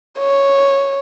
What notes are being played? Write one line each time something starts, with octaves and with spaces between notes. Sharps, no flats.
C#5